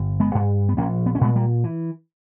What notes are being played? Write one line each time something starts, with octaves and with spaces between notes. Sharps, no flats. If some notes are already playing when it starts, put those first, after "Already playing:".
Already playing: G1
G#3 B3
G2
B3
A#1 A#3 C#4
B3
C#4
A#2 G#3 B3
G3 A#3
E3